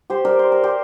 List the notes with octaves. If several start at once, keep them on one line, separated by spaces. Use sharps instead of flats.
G4 C5
A#4 D5
C5
A#4
G4 C5